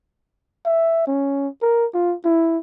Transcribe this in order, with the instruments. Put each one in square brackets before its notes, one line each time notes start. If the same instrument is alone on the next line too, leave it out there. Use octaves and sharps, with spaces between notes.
[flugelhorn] E5
C#4
A#4
F4
E4